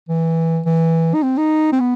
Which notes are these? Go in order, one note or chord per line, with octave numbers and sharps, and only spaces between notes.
E3
E3
D#4
C4
D#4
C4
B3